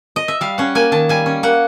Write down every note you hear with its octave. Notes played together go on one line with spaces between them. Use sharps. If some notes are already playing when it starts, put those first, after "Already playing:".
D#5
E5
G3 F5
C#4 F#5
A#3 G#5
D#3 A5
G3 G#5
C#4
A#3 F#5